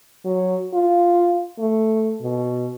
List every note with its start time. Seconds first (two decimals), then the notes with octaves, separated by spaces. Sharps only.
0.25 F#3
0.73 F4
1.59 A3
2.21 B2